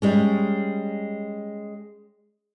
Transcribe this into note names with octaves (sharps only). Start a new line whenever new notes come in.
G3 G#3 C#4